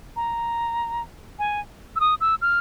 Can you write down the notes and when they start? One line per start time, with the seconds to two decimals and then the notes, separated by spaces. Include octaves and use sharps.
0.16 A#5
1.39 G#5
1.96 E6
2.00 D#6
2.21 E6
2.41 F6